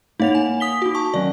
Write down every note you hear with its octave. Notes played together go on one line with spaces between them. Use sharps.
A#3 D#4 C#5 F#5 F7
G#5
D#6 B6 G7
D#4 F#4
A5 C#6
D#3 F#3 C#4 D5